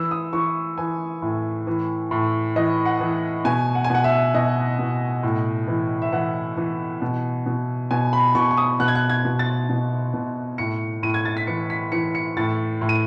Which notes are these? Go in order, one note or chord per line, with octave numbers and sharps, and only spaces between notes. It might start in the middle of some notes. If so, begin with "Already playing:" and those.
Already playing: E3 E6
D#6
E3 C#6
E3 G#5
A2
E3
A2
E3 D#5
F#5
E3
B2 G#5
F#5
G#5
B2 F#5
E5
B2 D#5
B2
A2
E3
E5
E3 F#5
E3
B2
B2
B2 G#5
B5
B2 C#6
C#6
D#6
B2 F#6
G#6
F#6
G#6
B2
A6
B2
B2
A2 C#7
A2 D#7
G#6
A6
B6
E3 C#7
B6
E3 C#7
C#7
A2 A6
A2
D#7